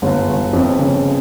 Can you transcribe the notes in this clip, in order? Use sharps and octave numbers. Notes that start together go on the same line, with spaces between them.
G1
G1
F2
C#3